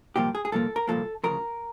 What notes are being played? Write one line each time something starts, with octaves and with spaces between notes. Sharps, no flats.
C2 A#2 F3 A#3 G4
G#4
G#4
C2 A#2 F3 A#3 A4
A#4
C2 A#2 F3 A#3 A4
D2 C#3 F3 A#4